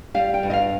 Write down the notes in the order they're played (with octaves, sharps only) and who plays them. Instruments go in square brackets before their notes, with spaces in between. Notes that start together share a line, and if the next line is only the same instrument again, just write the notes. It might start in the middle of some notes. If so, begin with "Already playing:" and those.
[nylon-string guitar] G3 F5
G5
G2
D#5
F5